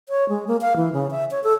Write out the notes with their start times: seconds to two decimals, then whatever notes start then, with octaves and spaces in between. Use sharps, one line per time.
0.09 C#5
0.29 G#3
0.48 A#3
0.61 F5
0.76 E3
0.93 C#3
1.11 E5
1.31 C#5
1.44 A4